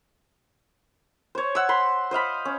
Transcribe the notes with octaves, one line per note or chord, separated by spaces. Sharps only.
C5 C#5
F#5 E6
B5 C6
C5 D#5 F5 B5
C#4